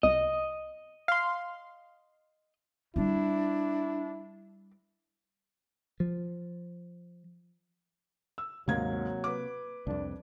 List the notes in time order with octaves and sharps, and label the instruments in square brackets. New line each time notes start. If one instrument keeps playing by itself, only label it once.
[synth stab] C2 [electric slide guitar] D#5
[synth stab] F5 C6
[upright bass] G3 C4 [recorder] D4 [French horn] E4
[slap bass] F3
[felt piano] E6
[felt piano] D#2 G#2 G#6 [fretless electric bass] C3 A#3 [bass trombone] F#3
[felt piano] B4 D6
[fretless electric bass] C2 F2 [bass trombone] D4